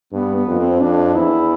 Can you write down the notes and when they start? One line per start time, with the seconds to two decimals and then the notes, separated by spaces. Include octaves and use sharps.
0.12 G2 B3
0.36 B3
0.47 F2
0.59 C4
0.81 F2 D4
1.16 E2 E4